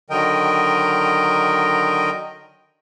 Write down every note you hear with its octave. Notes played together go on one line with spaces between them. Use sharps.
D3 D#3 F#3 A#4 D#5 G5